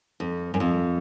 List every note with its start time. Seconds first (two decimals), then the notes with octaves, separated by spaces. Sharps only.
0.20 F2
0.54 F#2
0.60 F2